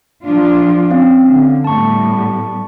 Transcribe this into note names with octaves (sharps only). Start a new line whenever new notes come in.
F3 D4 F4
C4 C#4 F5
D3
A2 G3 B3 A5 C#6